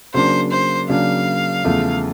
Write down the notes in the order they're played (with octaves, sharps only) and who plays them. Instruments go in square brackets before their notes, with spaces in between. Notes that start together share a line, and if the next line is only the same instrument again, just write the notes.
[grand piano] C#3 F#3 A#3 D4 [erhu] C5
[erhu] C5
[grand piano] C#3 F#3 A#3 D4 [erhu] F5
[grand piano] E2 C#3 F3 A3